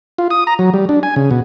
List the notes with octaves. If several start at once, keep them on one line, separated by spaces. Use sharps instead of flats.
F4
D#6
A#5
F#3
G3
D4
G#5
C#3
B2